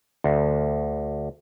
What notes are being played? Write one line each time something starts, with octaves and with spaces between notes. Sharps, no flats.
D2